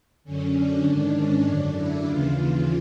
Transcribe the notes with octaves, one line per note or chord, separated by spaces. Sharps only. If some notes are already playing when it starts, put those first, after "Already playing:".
F#2 D3 C#4
D4
G#2 D#3
C#4
F#2 D3 D4
E4
D#2 C#3 E3 F4